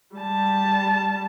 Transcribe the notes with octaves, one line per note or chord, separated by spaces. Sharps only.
G3 A5